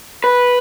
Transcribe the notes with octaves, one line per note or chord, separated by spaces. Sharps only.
B4